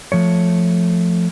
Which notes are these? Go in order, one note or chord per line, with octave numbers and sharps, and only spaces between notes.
F3 A3 C#5